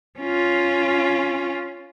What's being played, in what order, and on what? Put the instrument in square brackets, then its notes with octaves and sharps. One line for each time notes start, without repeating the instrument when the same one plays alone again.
[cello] C#4 F4